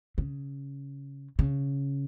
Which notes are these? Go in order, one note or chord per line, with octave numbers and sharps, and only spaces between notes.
C#3
C#3